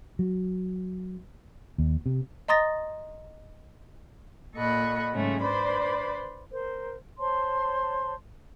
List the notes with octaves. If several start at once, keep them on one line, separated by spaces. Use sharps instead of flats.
F#3
D#2
C3
D#5 A#5 C6 D#6 A6 A#6
A#2 A4 D#5 F#5 B5 C#6
G#2 C#3 F#3 G#3 A3 C#4
D4 B4 C5 D5 B5
A#4 C5
C5 C#5 A5 C6